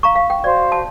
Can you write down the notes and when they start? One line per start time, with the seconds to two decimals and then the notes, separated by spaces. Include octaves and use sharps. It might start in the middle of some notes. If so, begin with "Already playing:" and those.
0.03 F5 A#5 C#6
0.15 F5
0.30 G5
0.44 F#4 C5 D5 F5
0.72 A5